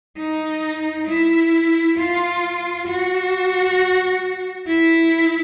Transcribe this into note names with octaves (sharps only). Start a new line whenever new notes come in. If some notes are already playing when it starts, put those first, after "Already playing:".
D#4
E4
F4
F#4
E4